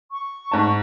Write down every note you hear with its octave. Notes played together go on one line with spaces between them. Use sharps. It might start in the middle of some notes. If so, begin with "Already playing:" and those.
C#6
G#2 A5